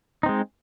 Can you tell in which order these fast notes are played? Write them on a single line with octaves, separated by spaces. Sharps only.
D#4 C4 G#3